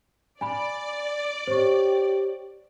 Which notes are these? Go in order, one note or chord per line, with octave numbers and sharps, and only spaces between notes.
D5 G#5 B5
G4 C5 C#5 C#6